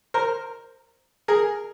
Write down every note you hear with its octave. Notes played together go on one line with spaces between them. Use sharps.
A#4 C5
G#4 A#4